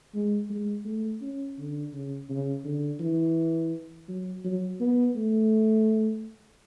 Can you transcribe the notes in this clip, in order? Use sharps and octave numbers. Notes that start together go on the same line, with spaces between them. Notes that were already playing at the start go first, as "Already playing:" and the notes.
G#3
G#3
A3
C#4
D3
C#3
C#3
D3
E3
F#3
F#3
B3
A3